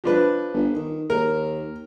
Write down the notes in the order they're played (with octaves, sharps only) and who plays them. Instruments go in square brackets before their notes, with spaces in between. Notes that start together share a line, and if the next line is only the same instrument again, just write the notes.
[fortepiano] F3 D4 B4
[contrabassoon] G1
D#3
[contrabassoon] D#2 [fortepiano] A#4